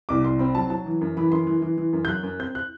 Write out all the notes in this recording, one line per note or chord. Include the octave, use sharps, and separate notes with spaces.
C2 D6
C2 C6
C4 B5
F#3 A5
F#3 A5
E3
F#2
E3 B5
F#2 C6
E3
E3
E3
F#2
G6
F#3 F#6
F#2
C4 G6
F#6